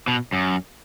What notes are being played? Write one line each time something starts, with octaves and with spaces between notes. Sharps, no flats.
B2
F#2